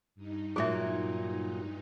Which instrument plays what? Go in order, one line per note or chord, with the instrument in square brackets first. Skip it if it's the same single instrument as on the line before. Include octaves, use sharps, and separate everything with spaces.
[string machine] G2 D#4
[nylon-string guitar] A#2 F#3 [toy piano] G#4 E5